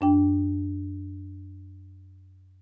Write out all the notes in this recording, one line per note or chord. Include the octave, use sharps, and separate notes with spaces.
F#2 D4 G5